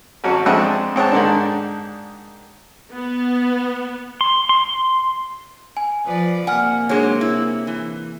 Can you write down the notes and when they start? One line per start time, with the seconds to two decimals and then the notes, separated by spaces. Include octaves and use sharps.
0.24 G#1 F#3 C#4 F#4
0.46 F2 G#3 C4 D4 E5 F#5
0.96 G#2 C4 C#5 F#5 A5
1.12 G#2 D3 D#3 D4
2.92 B3
4.21 C6
4.49 C6
5.77 G#5
6.05 F3 B4 D5
6.47 C3 A#3 F#5 G#5 F6
6.89 F#3 G#3 D4 G#4 C#5
7.21 E4
7.67 E3